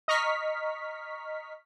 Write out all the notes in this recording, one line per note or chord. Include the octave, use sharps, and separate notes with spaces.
D#5 A#5 C#6 F6 B6